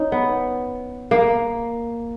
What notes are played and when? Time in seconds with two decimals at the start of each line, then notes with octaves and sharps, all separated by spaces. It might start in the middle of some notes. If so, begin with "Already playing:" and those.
Already playing: C#4 D#4
0.12 B3
1.11 A#3